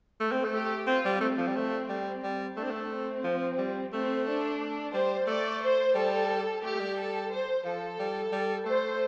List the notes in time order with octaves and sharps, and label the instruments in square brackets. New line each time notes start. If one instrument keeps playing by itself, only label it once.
[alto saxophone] A3
C4
A3
[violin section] G4
[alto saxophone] C4 [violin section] F4
[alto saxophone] G3
[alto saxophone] A3 [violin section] C4
[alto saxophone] F3
G3
A3
G3
G3
[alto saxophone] A3 [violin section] D4
[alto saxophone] C4
A3
[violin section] C4
[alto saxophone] F3
G3
[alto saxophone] A3 [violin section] C4
[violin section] D4
[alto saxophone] G3 [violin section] C5
[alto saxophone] A3 [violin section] D5
[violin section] C5
[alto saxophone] G3 [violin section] A4
[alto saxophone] A3 [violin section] G4
[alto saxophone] A3
G3
[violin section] A4
C5
[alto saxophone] F3 [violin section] A4
[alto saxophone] G3
G3
[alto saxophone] A3 [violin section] C5